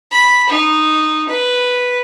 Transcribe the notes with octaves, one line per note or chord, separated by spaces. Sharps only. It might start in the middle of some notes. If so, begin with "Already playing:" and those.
B5
D#4
B4